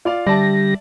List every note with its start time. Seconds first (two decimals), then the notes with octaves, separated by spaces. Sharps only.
0.05 F4 D5 F5
0.27 D3 G3 G4 D5 E5 A5 A#6